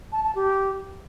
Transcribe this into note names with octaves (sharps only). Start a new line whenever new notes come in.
A5
A5
G4